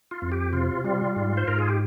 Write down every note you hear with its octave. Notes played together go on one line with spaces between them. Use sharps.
F4
F2
G4
C3 F4
G3 F4
G#2
C5
G#2 A#4
G#4
G4